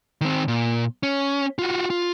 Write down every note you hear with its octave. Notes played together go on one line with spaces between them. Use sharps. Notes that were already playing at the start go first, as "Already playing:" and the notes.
D#3 C4
A#2
C#4
F4 F#4
F4